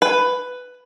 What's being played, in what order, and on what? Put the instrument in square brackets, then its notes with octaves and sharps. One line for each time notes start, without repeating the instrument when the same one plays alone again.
[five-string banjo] B4